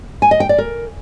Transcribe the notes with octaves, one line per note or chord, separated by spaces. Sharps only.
G#5
D#5
G5
D5
A#4